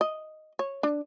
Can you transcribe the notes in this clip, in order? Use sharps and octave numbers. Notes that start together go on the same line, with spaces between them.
D#5
C#5
D4